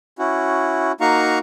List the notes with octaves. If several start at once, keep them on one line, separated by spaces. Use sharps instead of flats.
C#4 E4 F#4
A#3 D#4 F#4 F5 A#5 C#6